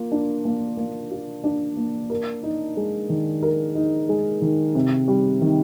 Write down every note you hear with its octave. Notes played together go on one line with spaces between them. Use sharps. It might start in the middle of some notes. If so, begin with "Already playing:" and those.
Already playing: A#3 F4
D4
A#3
A#3
F4
D4
A#3
A#4
D#4
G#3
D#3
A#4
D#4
G#3
D#3
C3
G3
D#3